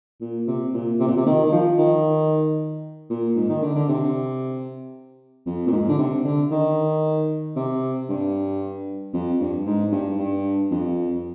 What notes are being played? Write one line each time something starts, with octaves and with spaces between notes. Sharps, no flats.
A#2
C3
A#2
C3
A#2
C3
D#3
D#3
F3
D#3
A#2
G#2
D#3
D3
D3
C3
F2
A#2
G#2
D3
C3
D3
D#3
C3
G2
F2
G2
G#2
G2
G2
F2